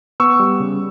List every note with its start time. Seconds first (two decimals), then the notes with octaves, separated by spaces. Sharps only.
0.20 B3 C#6 E6
0.39 G3
0.60 C#3